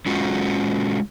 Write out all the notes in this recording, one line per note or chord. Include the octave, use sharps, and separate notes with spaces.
G#3 C#4 F4 F#4